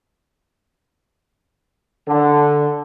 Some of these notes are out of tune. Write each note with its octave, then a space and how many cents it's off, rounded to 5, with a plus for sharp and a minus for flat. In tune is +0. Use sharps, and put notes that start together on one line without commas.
D3 +0